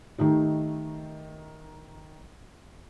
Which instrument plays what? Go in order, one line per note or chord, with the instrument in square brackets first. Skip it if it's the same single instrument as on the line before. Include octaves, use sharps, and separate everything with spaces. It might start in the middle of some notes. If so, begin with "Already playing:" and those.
[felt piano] D#3 A3 D#4 G4